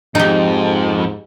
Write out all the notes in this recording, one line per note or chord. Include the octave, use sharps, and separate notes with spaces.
F2 G#2 D#4 G4